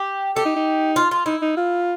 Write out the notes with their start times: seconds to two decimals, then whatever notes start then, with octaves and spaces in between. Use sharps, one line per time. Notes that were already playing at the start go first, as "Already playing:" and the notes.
Already playing: G4
0.36 G4 A4
0.46 D#4
0.56 D#4
0.96 F4
1.11 F4
1.26 D#4 E4
1.42 D#4
1.57 F4